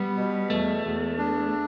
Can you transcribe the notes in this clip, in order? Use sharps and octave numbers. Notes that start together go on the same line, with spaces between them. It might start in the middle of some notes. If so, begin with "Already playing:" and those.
Already playing: G3 B3
B2
E2 A3
E2
D4